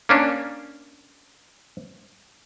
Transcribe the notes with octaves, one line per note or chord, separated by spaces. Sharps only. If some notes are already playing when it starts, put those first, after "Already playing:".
A#3 C#4 D4